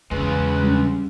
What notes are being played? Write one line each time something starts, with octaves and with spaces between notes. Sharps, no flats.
E2 C#3 G#3 B4
G3 C#4